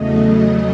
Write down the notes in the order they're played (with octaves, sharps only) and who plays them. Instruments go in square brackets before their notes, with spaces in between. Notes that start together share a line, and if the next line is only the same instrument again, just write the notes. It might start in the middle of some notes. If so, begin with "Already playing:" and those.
Already playing: [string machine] E2 C#3 F#3 A3 D#5